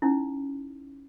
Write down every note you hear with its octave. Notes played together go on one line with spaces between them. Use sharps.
C#4 D#4 E4